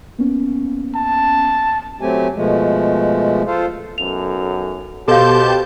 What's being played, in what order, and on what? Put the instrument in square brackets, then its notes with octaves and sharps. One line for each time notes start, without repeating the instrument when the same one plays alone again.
[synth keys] A#3 B3 C#4
[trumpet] A5
[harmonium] F#3 A3 C4 G4 G#5
B2 F3 G#3 A3
F4 A4 C5 F5
[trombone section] B1 F#2 A4 [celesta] F7
[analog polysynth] B2 A5 G6 [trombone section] G4 [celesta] A4 F5 [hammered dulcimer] C5